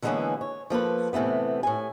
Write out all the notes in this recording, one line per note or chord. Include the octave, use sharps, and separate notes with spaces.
D3 E3 G#3 A#3 B3 C#4
C#5
F3 A#3 A4 B4
A2 C3 E3 A3 B3
A2 G#5